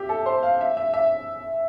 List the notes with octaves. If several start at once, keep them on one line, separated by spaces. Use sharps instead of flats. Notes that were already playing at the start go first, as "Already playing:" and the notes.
Already playing: G4 E5
A4
C5
F5
E5
E5
E5